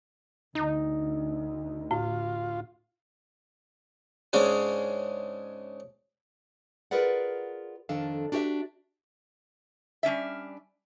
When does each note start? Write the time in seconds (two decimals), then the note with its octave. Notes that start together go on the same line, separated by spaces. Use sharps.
0.55 D2 D#4
1.91 A2 F4
4.33 G#2 C#3 G#3 C#4 D4 G#4
6.91 F4 G#4 A#4 B4 D5 F#5
7.89 F2 D#3 D4 A4 F5
8.32 D4 F#4 G4 B4 E5
10.03 G3 C#4 D4 E5